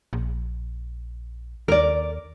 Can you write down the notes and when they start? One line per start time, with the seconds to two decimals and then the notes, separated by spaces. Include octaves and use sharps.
0.13 A#1
1.68 D#2 A#4 D5